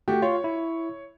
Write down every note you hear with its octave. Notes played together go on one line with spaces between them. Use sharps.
A3 F#4 G4
F4 C#5
E4